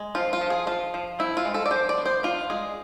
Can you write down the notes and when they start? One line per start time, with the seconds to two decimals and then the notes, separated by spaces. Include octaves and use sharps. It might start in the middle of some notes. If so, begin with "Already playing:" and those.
Already playing: G#3
0.15 F3 F4
0.33 F4
0.41 F3
0.50 G#4
0.67 F3 F4
0.94 F3
1.19 C4 E4
1.37 F4
1.45 G#3
1.54 A4
1.66 D5
1.71 F3 C5
1.89 D5
1.98 B3
2.06 C5
2.23 D4 F4
2.50 G#3 G#4